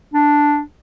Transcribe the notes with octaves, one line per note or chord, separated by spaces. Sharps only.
D4